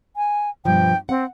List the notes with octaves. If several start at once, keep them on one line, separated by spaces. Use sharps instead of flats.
G#5
G2 B2 F3 G5
C4 F#5